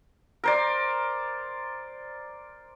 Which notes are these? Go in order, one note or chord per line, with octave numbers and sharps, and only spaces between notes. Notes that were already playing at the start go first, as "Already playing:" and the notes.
A#4 C5 D5